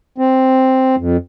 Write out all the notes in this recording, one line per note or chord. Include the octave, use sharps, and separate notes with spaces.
C4
F2